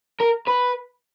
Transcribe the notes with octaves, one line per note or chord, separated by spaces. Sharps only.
A#4
B4